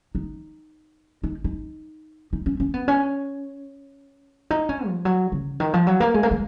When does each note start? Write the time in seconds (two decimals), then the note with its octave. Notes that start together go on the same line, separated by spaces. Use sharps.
0.15 D#4
1.23 D#4
1.44 D#4
2.33 D#4
2.46 C#4
2.60 C#4
2.74 B3
2.88 C#4
4.50 D#4
4.69 C#4
4.87 F3
5.05 F#3
5.32 C#3
5.60 D#3
5.74 F3
5.87 F#3
6.00 A#3
6.14 G#3
6.23 A#3
6.31 G#3